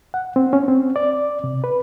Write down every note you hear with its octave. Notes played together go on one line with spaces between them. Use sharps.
F#5
C4
C#4
C4
D5
C3
B4